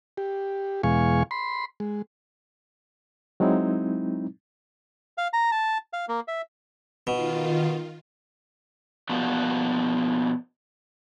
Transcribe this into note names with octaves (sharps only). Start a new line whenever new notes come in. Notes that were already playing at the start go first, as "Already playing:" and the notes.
G4
E2 B2 G#3 F5 G#5 C#6
B5 C6
G#3
F#3 G#3 C4 D#4 E4
F5
A#5
A5
F5
A#3
E5
B2 D#3 F4
B2 F3 G3 A#3 B3 F#4